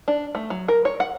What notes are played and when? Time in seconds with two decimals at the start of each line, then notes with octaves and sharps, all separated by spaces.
0.08 D4
0.35 A3
0.50 F#3
0.68 A#4
0.85 C#5
1.00 F#5